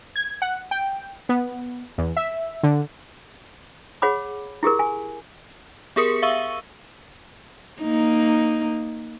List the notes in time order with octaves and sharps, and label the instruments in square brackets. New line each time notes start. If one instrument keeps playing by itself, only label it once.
[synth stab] G#6
F#5
G5
B3
E2
E5
D3
[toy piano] G#4 C#5 F#5 B5 D6
E4 G4 G#4 A#4
G#5
[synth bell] B3 G4 G#4 A#4 D#6 C#7
E5 F5 C#6 E6 D#7
[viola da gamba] A#3 D#4